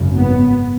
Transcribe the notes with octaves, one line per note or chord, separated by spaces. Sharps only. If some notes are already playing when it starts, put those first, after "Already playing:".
Already playing: G#1 F#2 C#3
B3